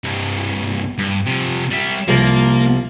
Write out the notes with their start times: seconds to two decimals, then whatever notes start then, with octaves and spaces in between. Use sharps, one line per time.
0.04 C2 G2
0.98 G2
1.26 C3 F3
1.70 G3 E5
2.08 C2 F3 A#3